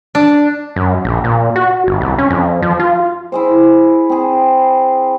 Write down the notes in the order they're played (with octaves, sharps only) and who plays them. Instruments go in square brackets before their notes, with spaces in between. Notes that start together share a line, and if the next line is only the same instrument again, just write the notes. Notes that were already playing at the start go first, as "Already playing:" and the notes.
[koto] D4
[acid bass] F#2
A#1
A#2
F#4
G1
C2
C#4
F2
F3
F4
[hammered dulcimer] E4 G#4 C5
C4 G#4